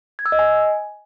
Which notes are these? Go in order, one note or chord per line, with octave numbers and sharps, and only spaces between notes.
G#6
E6
D#5
G#5